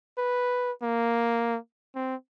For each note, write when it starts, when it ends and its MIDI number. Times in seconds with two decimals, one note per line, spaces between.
0.18 0.72 71
0.82 1.57 58
1.95 2.16 60